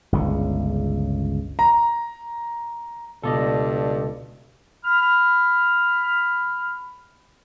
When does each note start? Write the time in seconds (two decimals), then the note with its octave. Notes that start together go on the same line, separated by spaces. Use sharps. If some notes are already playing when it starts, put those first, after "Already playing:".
0.12 G1 C#2 C#3
1.59 A#5
3.23 C#2 G2 B2 F4 A4 D5 D#5
4.85 B5 F6